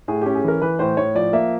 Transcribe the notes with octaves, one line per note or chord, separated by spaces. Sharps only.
A2 G#4
C#4 G4
G#4
E3 A#4
E3 B4
A2 C5
A2 C#5
F3 D5
A#3 E5